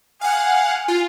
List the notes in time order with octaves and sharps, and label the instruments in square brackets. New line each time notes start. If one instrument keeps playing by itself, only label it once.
[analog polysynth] F5 F#5 [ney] G#5
[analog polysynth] F4